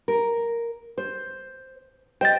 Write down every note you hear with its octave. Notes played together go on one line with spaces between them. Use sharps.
A#4
C5
C5 D#5 G5 A6